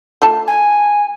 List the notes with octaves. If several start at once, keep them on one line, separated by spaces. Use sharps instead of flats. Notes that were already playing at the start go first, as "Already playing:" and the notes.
A3 F4 A5
G#5